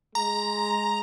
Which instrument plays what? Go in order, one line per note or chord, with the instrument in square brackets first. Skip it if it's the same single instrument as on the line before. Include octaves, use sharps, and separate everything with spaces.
[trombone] G#3 [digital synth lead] A#5